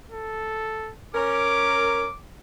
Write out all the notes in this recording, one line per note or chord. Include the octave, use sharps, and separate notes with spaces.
A4
C#4 A#4 D6